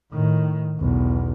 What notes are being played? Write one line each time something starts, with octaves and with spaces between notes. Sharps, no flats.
A2 D#3
B1 E2